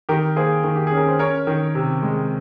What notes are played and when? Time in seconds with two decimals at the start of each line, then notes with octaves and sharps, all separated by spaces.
0.09 D#3 G4 A#4
0.36 A#3 G#4 C5
0.64 D#3
0.76 G4
0.87 C#4 G#4
0.97 A#4
1.08 C5
1.19 C#4 A#4 C#5
1.47 D#3
1.75 C3
2.02 G#3